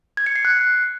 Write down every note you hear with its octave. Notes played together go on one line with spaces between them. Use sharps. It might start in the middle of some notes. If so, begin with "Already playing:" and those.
G#6
C#7
C7
F#6